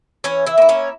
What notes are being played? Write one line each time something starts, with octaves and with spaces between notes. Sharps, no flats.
E3 C#4 C#5
E4 E5
A#3 E4
C#4 C#5